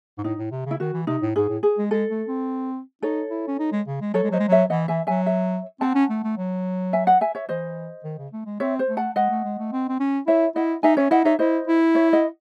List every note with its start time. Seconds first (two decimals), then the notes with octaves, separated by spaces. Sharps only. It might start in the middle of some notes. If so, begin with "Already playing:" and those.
0.18 G#2
0.24 A2 D#4
0.39 A2
0.51 C3
0.66 C#3
0.71 E4
0.80 D#3 F#4
0.94 E3
1.07 C3 D#4
1.22 A2
1.36 G#2 G#4
1.49 A2
1.63 G#4
1.78 G#3
1.91 G#3 A4
2.10 A3
2.28 C4
3.03 D#4 A4 C#5
3.30 E4
3.48 C#4
3.59 D#4
3.72 G#3
3.87 C#3
4.01 G#3
4.14 F#3 A4 C#5
4.23 G#3
4.31 F#3 C5 D#5
4.40 G#3
4.48 F#3 C#5 E5
4.70 E3 D#5 F#5
4.88 E3 E5 G#5
5.07 F#3 E5 G#5
5.26 C#5 E5
5.81 C4 F#5 A5
5.95 C#4
6.10 A3
6.24 A3
6.38 F#3
6.93 E5 G#5
7.07 D#5 F#5
7.21 E5 G#5
7.35 C#5 E5
7.49 E3 C5 D#5
8.04 D#3
8.18 C#3
8.33 A3
8.46 G#3
8.60 C4 C#5 E5
8.79 C5
8.89 A3
8.97 F#5 A5
9.16 G#3 D#5 F#5
9.30 A3
9.45 G#3
9.59 A3
9.72 C4
9.89 C4
10.00 C#4
10.27 E4 C#5 E5
10.56 E4 D#5 F#5
10.83 D#4 E5 G#5
10.97 C#4 C#5 E5
11.11 E4 D#5 F#5
11.25 D#4 C#5 E5
11.39 E4 C5 D#5
11.68 E4
11.95 C#5 E5
12.13 D#5 F#5